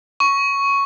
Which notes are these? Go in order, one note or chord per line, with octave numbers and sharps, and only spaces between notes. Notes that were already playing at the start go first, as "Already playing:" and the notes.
C#6